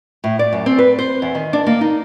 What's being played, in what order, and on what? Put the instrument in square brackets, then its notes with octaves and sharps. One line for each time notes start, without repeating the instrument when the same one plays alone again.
[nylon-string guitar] A2
D5
F#2
C4
B4
C5
E2
D#3
D4
A#3
D#4